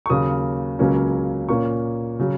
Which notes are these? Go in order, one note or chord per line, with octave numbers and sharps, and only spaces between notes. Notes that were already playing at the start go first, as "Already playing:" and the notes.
C#6
D#2 C#3 F#3 A#3 D#6
C#2 C#3 F#3 A#3 C#4
A#2 A#3 C#4 C#6
C#3 F#3